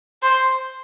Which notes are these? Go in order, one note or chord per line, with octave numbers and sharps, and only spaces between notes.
C5